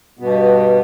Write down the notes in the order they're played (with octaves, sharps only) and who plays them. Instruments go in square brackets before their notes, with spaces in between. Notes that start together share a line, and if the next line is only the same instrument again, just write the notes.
[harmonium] G2 B2 B3